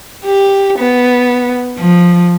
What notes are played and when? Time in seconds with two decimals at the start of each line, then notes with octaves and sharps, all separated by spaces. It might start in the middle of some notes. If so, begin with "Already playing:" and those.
0.24 G4
0.77 B3
1.78 F3